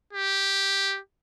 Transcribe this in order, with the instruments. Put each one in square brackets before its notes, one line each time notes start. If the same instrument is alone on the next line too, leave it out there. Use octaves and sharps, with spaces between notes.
[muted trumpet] G4